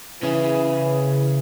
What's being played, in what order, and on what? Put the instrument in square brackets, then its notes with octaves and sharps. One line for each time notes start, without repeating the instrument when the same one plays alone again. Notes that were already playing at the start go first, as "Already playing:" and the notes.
[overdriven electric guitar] C#3 C#4 [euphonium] E3